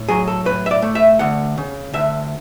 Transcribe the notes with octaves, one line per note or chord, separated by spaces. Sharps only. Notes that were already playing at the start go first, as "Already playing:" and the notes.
Already playing: A2
F#3 G#4
A4
A2 B4
E5
D5
A3
E5
D2 F#5
C#3
D2 E5